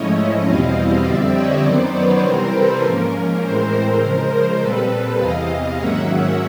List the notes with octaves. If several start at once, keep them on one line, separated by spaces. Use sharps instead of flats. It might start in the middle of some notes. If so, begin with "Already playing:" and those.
Already playing: G#2 F3 A3 C#4 E4 C#5 D#5
E2 B2 G3 C4 E4 D#5 F5
F2 D3 G3 C4 D5 E5
C#5 D#5
F#2 D#3 F#3 B3 D#4 C5 D5
B4 C#5
C3 E3 G3 C4 A#4 C5
A4 B4
G#2 F3 A#3 C#4 A#4
A#4
A2 E3 G#3 C4 A#4 C5
C#3 F3 G#3 A#4 C5
A#4 C5
A#2 G3 C4 A4 B4
E2 C3 E3 D#5 F5
G#2 D#3 F#3 A#3 C#4 E5 F#5